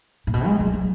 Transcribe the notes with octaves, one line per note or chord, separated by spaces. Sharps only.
A#2
B2
G#3
F#3
F#3